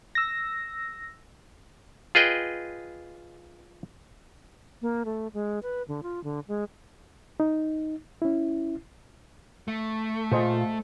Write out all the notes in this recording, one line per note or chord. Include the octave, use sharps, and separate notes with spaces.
E6 A#6
F4 G#4 B4 D#5 G5
A#3
A3
G#3
B4
D3
F4
D3
G#3
D#4
C#4 E4
A3
A#2 F4 G#4 C5 D#5